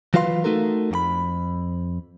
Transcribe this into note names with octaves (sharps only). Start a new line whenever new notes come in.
E3 F#3 F4 B4 F5 C6
A3 D#4 F#4 A4 A#4
F2 F#4 B5